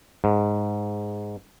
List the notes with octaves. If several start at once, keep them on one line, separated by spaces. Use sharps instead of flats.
G#2